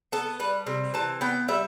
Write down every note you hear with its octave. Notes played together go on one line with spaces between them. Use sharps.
B3 A4
G3 B4
C3
E3 A5
B3 G5
G3 E5